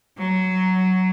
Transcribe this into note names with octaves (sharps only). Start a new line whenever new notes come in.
F#3